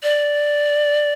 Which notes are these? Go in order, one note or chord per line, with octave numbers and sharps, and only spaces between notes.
D5